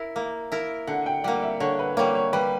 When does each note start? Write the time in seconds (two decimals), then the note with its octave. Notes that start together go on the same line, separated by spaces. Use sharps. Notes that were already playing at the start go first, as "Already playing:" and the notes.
Already playing: E4 A#4
0.16 A#3
0.52 E4 A#4
0.87 D3 F#5
1.06 G5
1.24 G3 A#3 F#5
1.43 E5
1.60 D3 C#5
1.79 B4
1.97 G3 A#3 C#5
2.15 C#5
2.33 G3 B4